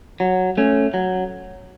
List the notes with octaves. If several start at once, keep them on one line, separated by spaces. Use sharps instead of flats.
F#3
A3 C#4
F#3